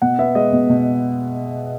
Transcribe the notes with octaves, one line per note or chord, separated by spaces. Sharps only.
B2 F#5
B3 E5
G#3 D#5
B2
B2